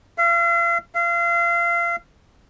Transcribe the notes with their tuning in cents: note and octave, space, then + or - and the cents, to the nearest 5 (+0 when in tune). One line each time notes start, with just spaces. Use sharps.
F5 -40
F5 -30